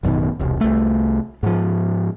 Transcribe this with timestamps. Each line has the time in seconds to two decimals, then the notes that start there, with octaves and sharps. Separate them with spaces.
0.03 A1 F#2 B2 D#3
0.39 E1 C2
0.61 C2 A3
1.43 G#2 F3